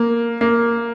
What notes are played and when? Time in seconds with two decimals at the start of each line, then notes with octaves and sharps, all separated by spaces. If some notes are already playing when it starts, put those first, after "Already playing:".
Already playing: A#3
0.41 A#3